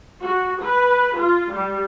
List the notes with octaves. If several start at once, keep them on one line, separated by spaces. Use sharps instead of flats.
F#4
B4
F4
G3